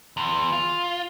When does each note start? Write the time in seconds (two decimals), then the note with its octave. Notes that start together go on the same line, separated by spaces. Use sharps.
0.17 E2 C6
0.53 F4